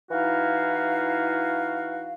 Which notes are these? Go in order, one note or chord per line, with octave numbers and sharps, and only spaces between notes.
E3 D#4 E4 F#4 F5